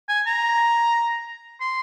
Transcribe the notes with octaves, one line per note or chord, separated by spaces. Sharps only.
G#5
A#5
C6